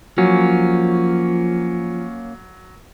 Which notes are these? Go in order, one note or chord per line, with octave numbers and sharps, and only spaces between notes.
F3 F#3 A#3 C#4